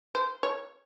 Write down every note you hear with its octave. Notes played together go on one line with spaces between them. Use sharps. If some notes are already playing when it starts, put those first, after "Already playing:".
C5
C#5